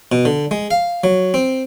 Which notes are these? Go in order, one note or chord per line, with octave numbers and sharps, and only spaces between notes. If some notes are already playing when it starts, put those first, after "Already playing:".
B2
D3
G#3
F5
F#3
C4